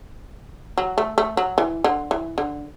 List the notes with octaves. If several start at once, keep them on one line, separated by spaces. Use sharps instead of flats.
F#3
A3
A3
F#3
E3
D3
E3
D3